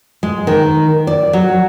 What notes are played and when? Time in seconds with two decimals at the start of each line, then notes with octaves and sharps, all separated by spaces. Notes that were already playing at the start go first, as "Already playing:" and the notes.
0.23 G#3
0.47 D#3
1.07 D5
1.33 F#3